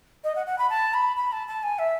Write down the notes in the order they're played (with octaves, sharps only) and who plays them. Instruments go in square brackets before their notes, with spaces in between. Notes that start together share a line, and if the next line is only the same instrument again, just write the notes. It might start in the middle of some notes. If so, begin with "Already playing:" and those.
[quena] D#5
F#5
F#5
B5
A5
B5
B5
A5
A5
G#5
E5